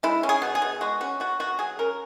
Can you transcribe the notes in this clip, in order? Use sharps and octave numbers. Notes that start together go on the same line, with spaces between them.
G#3 E4
C#4
G#4
B2
G#4
B2
G#3 F#4
C#4 F#4
B2 F#4
B2 F#4
F#3 G#4
C#4 A#4